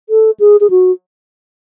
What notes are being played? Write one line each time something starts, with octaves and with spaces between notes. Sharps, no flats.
A4
G#4
G#4
F#4